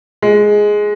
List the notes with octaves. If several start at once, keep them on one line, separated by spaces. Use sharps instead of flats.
G#3